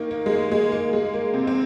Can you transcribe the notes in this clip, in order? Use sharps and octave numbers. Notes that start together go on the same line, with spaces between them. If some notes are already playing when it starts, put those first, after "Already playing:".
Already playing: D#3 A#3 D#4
A#3
G#3
A#3
G#3
A#3
G#3
A#3
C3 C4
C4